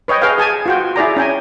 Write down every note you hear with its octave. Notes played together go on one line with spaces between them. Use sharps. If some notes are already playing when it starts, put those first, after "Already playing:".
B4 C#5 D#5 G5
G#4 B4 D#5 F5 G5
G#4 G#5 A5
F4 F#4 G5
E4 G#4 D5 A#5
C#4 G5 G#5